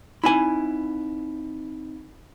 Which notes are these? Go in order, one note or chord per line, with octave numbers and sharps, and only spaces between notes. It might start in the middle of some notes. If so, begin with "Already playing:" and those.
C4 D#4 E4 G#5 B5